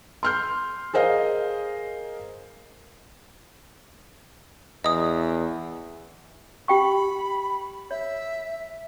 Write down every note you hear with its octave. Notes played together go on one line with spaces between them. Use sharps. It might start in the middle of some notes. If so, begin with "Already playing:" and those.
C6 F6 G6
G#4 A#4 C5 D#5 F5
E2 D#5 D#6
G4 G5 B5 C#6
C#5 E5